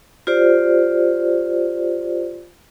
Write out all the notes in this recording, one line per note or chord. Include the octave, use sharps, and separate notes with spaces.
F4 G4 C5 D5